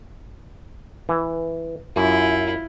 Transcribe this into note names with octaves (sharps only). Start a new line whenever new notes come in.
E3
F#2 E4 F4